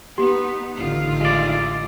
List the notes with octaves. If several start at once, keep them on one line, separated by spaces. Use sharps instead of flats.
B3 D#4 G4
A1 D3 D#3 F4
G#3 D5